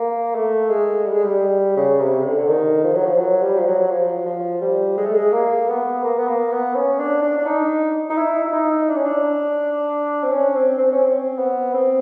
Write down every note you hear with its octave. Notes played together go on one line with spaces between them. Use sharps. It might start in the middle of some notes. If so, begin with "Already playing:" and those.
Already playing: A#3
A3
G#3
G3
G#3
G3
C#3
C3
D3
D3
D#3
F3
F#3
F3
F#3
G3
F3
F#3
F#3
F3
F3
G3
G#3
A3
G#3
A#3
B3
A#3
B3
A#3
B3
C#4
D4
D4
D4
D#4
D#4
E4
E4
D#4
D4
C#4
D4
C4
C#4
C4
C4
C#4
C4
B3
C4